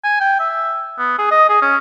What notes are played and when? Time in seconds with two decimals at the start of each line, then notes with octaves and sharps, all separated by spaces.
0.04 G#5
0.20 G5
0.39 E5
0.98 B3
1.19 G#4
1.31 D#5
1.49 G#4
1.62 C#4